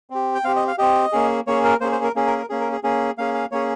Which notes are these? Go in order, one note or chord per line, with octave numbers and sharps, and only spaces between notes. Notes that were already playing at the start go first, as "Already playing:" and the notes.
C4 G4
G5
C4 G4 F5
D#5
F5
C4 G4 D#5
A#3 C#4 G#4
A#3 C#4 G#4 C#5
A#4
A#3 C#4 G#4 C5
C5
A#4
A#3 C#4 G#4
A#4
A#4
A#3 C#4 G#4
A#4
G#4
A#3 C#4 G#4
A#3 C#4 G#4 F5
F5
A#3 C#4 G#4 C#5